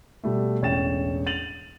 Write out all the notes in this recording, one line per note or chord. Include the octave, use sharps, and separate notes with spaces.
B2 G3 A3
E1 A1 C#5 G5 A6 E7
A6 D#7 F7 F#7